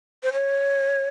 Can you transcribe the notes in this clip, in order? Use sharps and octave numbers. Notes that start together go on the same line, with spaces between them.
C5
C#5